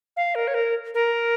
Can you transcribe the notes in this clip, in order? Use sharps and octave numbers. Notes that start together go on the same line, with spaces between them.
F5
A#4
C#5
A#4
A#4